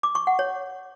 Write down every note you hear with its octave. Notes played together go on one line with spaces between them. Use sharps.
D6
C#6
F#5
C#5